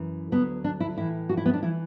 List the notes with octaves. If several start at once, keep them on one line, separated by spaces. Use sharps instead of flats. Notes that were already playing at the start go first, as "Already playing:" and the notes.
Already playing: F#2 E3
D2 D3 F#3 B3
D4
E4
A2 E3 E4
F#4
E4
B3
D4
E3 E4